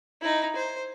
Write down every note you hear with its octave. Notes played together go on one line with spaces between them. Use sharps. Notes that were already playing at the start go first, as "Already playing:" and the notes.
D#4 E4
C5